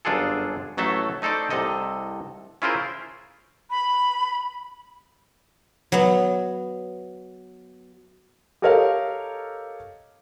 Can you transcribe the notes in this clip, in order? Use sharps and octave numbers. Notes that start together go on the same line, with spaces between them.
G1 F#2 D4 F4 G#4 A4
A1 F#3 A3 A4 E5 A5
A3 D#4 A4 C5 D5
C2 C3 A4 D#5
C#4 E4 F4 G#4 A#4 C5
B5
F#3 B3
G4 A4 A#4 C#5 D#5 F5